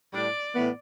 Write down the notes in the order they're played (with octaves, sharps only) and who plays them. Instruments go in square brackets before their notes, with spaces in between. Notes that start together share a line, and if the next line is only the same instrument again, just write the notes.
[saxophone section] A2 G3 D4 [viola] D5
[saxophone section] A2 E3 B3